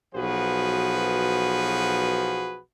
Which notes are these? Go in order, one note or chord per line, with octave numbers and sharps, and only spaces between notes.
B1 F3 F#4 G#4 B4